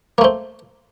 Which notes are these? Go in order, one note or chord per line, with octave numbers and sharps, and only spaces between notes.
A3 A#3 C4